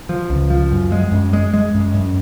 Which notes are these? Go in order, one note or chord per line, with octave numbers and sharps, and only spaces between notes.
F3
C#2
F3
F#2
G#3
F#2
G#3
G#3
F#2
F#2